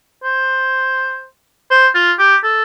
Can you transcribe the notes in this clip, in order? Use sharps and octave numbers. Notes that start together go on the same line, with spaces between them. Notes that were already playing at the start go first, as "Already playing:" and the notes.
C5
C5
F4
G4
A4